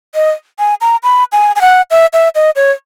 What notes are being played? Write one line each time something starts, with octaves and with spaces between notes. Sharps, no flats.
D#5
G#5
A#5
B5
G#5
G#5
F#5
E5
E5
D#5
C#5